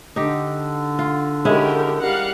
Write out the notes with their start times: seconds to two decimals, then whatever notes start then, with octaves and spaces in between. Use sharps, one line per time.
0.16 D3 D4 D#4 G4
0.99 F4
1.45 D#3 G#3 C#4 E4 G4 A#4
2.02 G3 A#4 F5 F#5